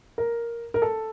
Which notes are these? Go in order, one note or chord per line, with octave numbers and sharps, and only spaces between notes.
A#4
A#4
A4